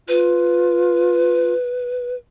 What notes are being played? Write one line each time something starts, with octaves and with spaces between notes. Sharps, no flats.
F4 B4